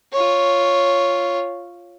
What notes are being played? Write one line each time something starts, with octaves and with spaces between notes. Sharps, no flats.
F4 C#5